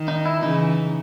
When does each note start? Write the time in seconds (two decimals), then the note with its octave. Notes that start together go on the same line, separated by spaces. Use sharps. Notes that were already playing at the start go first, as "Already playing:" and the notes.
Already playing: D#3
0.08 D#4
0.25 E4
0.43 C#3 E3 D#4